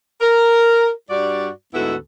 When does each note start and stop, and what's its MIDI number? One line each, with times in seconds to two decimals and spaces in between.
0.21 0.89 70
1.10 1.49 43
1.10 1.49 55
1.10 1.49 66
1.10 1.49 74
1.74 1.95 38
1.74 1.95 44
1.74 1.95 59
1.74 1.95 64
1.74 1.95 66
1.74 1.95 69